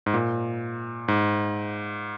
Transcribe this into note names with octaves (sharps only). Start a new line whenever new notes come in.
G#2
A#2
G#2